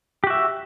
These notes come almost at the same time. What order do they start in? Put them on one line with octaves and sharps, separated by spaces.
G4 F#4 E5